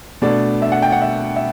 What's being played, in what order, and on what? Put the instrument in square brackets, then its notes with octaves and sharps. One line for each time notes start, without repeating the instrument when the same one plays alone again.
[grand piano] B2 A3 D4 D5
E5
F#5
G5
F#5
E5
E5